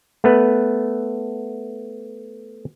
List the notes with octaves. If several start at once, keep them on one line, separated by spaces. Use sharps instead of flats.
A3 B3 B4